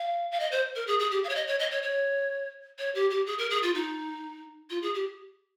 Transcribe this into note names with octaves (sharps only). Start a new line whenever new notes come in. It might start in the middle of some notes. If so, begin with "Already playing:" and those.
Already playing: F5
F5
D#5
C5
A#4
G#4
G#4
G4
F5
C#5
D#5
C#5
D#5
C#5
C#5
C#5
G4
G4
G#4
A#4
G#4
F4
D#4
F4
G#4
G4